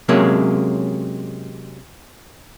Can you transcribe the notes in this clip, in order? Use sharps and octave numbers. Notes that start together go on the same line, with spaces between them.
C3 F#3 G#3 A#3 C#4